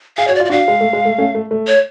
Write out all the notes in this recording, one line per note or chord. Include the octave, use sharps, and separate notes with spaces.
G#4 F5
F#4 C#5
D5
F4
D5
D4 F#4 F5
G#3
A3
G#3
A3
A3 C#4
A3
A3
C#5